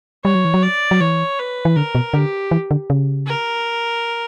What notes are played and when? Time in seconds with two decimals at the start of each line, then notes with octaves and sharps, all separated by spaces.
0.25 G3 C#5
0.35 F#3
0.45 E3
0.54 F#3
0.63 D5
0.91 F#3
1.01 E3 C#5
1.39 B4
1.65 E3
1.76 D3 A#4
1.95 B2
2.14 D3 G4
2.51 E3
2.71 D3
2.90 C#3
3.27 A#4